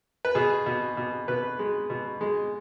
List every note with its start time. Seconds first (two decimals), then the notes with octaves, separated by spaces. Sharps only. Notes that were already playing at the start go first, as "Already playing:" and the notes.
0.25 B4
0.35 B2 G#4
0.66 B2
0.97 B2
1.28 B2 B4
1.59 G#3
1.90 B2
2.21 G#3